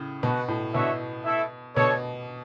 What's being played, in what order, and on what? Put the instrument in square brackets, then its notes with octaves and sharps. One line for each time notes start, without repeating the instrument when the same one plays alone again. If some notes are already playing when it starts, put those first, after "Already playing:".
Already playing: [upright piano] A2 C#3
[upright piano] B2 [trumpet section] F#4 B4 F#5
[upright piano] A2
[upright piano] B2 [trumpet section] D4 F#4 C#5 E5
[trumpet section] A3 E4 A4 E5
[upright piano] B2 [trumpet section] D4 A4 C#5